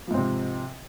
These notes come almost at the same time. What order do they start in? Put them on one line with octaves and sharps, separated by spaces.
F3 G#2 C4 C3